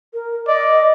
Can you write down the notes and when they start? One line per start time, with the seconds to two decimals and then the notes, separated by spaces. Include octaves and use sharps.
0.14 A#4
0.47 D5 D#5